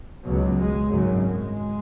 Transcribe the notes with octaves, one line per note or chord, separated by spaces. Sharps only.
C#2 B2 F#3
G#3
G#1 F#2 C#3 F#3
G#3